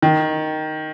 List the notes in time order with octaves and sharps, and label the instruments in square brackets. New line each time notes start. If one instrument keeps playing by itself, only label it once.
[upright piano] D#3